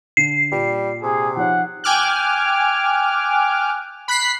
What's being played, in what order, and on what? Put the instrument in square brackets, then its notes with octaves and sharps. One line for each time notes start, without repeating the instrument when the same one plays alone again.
[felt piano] D3 [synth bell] C7
[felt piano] A#2 [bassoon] G3
[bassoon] C3 [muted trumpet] G#4
[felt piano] F3 D#4 C#5 [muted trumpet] F#5
[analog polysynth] G5 G#5 D6 F6 F#6
B5 F#6 B6 C7